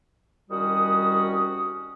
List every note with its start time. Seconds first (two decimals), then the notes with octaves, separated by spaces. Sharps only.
0.50 C2 D#3 G3 C#4 F#4 D#6